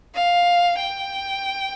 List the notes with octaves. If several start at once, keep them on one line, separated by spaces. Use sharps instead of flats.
F5
G5